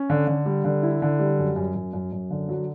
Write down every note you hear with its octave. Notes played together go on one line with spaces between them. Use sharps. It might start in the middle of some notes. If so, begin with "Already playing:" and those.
Already playing: C#4
D3
D3
G3
D3
E4
D3
G3
F#2
F#2
F#2
F#2
F#2
D3
F#3